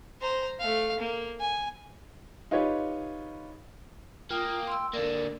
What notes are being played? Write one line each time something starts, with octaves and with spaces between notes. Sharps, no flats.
C5 A#5
A3 F5
A#3
G#5
D#4 F4 G4 B4 C#5
A#3 F4 G5 D#6
C6 E6
D3 A#3 A#4 D5